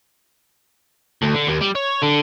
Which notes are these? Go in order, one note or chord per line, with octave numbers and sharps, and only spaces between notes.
D2
D3
D#2
G3
C#5
D3